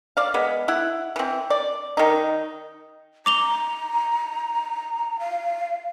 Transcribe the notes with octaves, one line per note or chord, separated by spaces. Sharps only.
D5 F5
G#3 B3
E4 F#5
E3 C4
D5
D#3 D#4
A#5 D6 F7 G7
F5